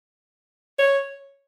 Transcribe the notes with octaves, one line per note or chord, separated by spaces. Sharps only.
C#5